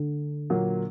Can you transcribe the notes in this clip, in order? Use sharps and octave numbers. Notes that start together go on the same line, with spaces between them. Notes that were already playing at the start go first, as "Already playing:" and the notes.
Already playing: D3
A#2 F#3 A#3